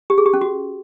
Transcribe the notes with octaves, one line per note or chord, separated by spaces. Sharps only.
G4
G#4
G4
C#4
F#4